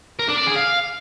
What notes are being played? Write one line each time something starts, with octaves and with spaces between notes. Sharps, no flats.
A#4
D4
D5
G#4
F5